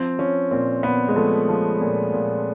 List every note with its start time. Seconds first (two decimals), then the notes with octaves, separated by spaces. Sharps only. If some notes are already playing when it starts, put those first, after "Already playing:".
Already playing: F3 C4
0.19 F3 C#4
0.51 A#2 C4
0.83 A#2 B3
1.09 G#3
1.16 F3 A3
1.49 F3
1.81 A#2
2.13 A#2